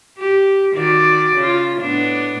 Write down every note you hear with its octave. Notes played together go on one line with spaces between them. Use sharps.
G4
D#3 F#4 D5
C#3 F4
A2 B3 D4